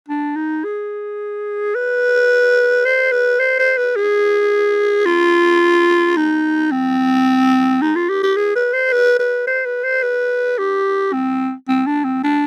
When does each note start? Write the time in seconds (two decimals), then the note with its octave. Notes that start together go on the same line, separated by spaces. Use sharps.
0.09 D4
0.36 D#4
0.64 G#4
1.75 B4
2.86 C5
3.12 B4
3.40 C5
3.59 C5
3.78 B4
3.96 G#4
5.06 F4
6.17 D#4
6.72 C4
7.82 D#4
7.96 F4
8.09 G4
8.23 G4
8.36 G#4
8.56 B4
8.74 C5
8.93 B4
9.19 B4
9.47 C5
9.65 B4
9.84 C5
10.03 B4
10.58 G4
11.13 C4
11.69 C4
11.87 D4
12.04 C4
12.24 D4